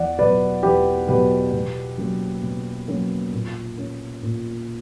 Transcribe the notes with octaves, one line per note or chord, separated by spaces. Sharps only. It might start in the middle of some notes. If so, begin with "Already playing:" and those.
Already playing: E2 D5 F#5
B2 F#3 B3 B4 D5
E2 G4 B4
B2 F#3 B3 G4 B4
B2
F#3 A#3 C#4
B2
F#3 A#3 C#4
A#2
A#3 C#4
A#2